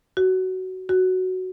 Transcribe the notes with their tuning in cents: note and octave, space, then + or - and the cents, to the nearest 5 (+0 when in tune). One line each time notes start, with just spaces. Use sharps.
F#4 +15
F#4 +5